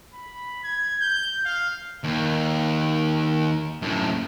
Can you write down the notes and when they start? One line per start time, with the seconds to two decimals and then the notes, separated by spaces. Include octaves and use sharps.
0.14 B5
0.63 G#6
1.01 G6
1.46 F5
2.04 D#2
3.82 F#2 A2